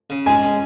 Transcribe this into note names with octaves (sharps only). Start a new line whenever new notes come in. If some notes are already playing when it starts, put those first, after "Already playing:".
C#3
G#3 G#5
C#4